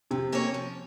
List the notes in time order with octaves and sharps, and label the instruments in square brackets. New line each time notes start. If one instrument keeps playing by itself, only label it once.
[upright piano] C3 [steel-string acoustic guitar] F3
[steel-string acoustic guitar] A#3 C#4 A4 C#5
F3